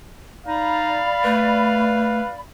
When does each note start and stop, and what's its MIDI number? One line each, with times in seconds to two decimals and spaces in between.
0.46 1.02 63
0.46 2.40 74
0.46 2.39 77
0.46 2.40 83
1.24 2.20 57
1.24 2.29 71